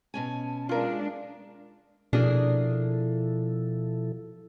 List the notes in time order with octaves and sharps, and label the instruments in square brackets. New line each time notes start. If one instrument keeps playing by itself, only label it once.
[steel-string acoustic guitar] B2 C#4 G#5 [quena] A5
[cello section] G#3 D4 [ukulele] F4 A#4 [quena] F5
[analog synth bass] B2 [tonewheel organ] F3 E4 A4 [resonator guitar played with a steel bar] A#3 D4 G#4